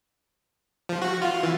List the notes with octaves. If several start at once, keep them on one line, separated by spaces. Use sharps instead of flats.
F3
F#4
F4
E3